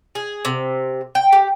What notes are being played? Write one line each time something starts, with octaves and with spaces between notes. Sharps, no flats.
G#4
C3
G5
G4